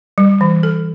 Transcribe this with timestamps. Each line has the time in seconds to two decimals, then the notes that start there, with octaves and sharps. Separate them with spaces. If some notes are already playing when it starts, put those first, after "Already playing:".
0.18 G3
0.41 E3
0.63 A4